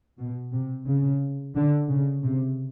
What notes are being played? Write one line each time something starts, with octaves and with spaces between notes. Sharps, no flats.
B2
C3
C#3
D3
C#3
C3